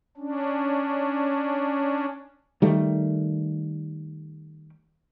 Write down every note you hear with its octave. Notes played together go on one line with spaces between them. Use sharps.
C#4 D4
D#3 G3 A3